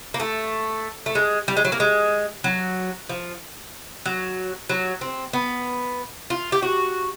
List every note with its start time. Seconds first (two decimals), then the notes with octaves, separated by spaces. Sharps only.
0.14 A#3
0.20 A3
1.06 A3
1.15 G#3
1.48 G3
1.57 G#3
1.65 F#3
1.72 A#3
1.80 G#3
2.44 F#3
3.09 F3
4.06 F#3
4.69 F#3
5.01 C4
5.33 B3
6.30 F4
6.52 G4
6.62 F#4